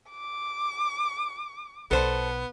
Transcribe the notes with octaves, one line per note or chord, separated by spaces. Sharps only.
D6
B1 B3 A4 C5